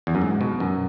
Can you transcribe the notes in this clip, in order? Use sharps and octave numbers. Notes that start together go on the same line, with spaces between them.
E2
F#2
G#2
B2
F#2